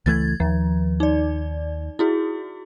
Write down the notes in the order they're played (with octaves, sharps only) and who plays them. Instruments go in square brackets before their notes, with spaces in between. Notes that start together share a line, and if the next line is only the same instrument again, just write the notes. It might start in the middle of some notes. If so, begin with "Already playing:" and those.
[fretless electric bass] C#2 E3 A3 [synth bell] G#6 A6
[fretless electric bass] D#2 [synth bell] F3
[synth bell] D#4 D5
E4 F#4 G#4